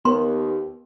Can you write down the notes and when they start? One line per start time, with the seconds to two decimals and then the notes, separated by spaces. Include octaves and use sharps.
0.05 D#2 B3 C6